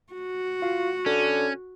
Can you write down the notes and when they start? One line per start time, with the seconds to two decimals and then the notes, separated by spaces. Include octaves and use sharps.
0.13 F#4
0.62 F4
1.06 D3 C#4